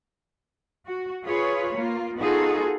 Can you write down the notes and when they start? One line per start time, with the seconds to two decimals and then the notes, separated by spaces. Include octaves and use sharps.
0.88 F#4
1.24 F4 G#4 B4 C#5
1.75 A#3 F4
2.18 B3 D#4 F4 F#4 G#4 A4